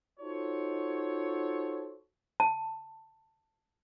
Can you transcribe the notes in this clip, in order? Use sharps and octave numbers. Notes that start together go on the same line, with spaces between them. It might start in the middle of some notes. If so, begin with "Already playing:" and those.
D#4 F4 F#4 A4 C5 C#5
A5